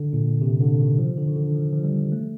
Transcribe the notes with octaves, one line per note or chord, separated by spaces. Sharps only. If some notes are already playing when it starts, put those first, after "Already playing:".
Already playing: D3
A#2
C3
D3
D#3
F3
D3
D#3
D3
F3
F3
G3
A3